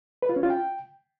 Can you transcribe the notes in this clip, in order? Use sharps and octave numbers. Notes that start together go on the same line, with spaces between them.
B4
F4
C#4
F4
G5